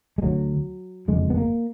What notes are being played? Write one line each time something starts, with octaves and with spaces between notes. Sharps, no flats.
G#3
D2 D3 F#3
F#1 F2 D3 G#3
B3
A#3